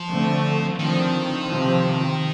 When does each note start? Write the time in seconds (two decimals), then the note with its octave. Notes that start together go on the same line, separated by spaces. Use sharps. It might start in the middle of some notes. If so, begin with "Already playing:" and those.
Already playing: F3
0.10 D3 A3 C4
0.79 D3 D#3 F3 C4
1.48 C3 F3 C4